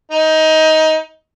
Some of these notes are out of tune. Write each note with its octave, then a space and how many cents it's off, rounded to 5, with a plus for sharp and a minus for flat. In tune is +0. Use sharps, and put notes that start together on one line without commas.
D#4 +20